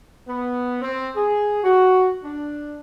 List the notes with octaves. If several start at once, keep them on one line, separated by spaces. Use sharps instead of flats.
B3
C4
G#4
F#4
D4